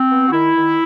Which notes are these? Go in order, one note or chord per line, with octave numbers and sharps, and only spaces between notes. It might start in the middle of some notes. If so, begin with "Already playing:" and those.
Already playing: C4
B3
F#4
D#3 E4
D#3